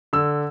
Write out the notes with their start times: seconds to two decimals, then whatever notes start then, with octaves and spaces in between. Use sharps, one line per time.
0.13 D3 E6